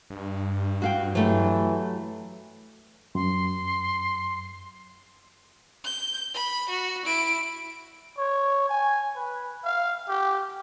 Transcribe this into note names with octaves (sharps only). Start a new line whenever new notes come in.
G2
F#4 F5 G5
E3 F#3 A3 G4
F#2 C6
G6
B5
F#4
E4 D7
C#5
G#5
B4
F5
G4